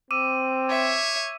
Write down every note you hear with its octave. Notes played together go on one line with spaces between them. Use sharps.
C4 D6 E6 D#7
C#5 E5